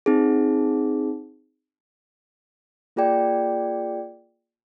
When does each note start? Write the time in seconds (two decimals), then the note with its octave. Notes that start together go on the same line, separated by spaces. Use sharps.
0.06 C4 D#4 G#4
2.96 A#3 F4 G#4 D5 G5